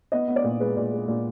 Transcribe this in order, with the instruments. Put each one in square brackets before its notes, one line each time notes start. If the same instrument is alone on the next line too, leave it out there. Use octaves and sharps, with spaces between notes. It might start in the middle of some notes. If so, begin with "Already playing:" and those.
[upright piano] B3 D#5
B3
D5
A#2
G#3 B4
A#2
G#3
A#2